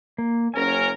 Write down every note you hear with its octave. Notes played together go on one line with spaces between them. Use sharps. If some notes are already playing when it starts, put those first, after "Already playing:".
A#3
F#1 C#4 A#4 G#5